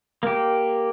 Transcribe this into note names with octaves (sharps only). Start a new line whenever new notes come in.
A#3 G4